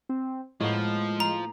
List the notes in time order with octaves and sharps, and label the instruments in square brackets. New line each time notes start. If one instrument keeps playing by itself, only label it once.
[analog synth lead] C4
[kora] A2 A#3 B3 [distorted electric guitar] F3 [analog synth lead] G#3
[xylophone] A#5